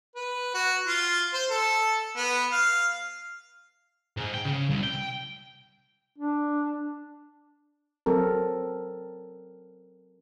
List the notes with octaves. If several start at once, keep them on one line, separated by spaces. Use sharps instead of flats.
B4
F#4
F4
C5
A4
B3
F5
G#2
G5
C#3
C2
G5
D4
F#3 C4 A4 A#4